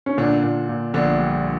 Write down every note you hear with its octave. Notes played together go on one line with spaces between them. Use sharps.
C#4
A#2 D3 D4
A#2
A#2
A#1 D3 D4
G3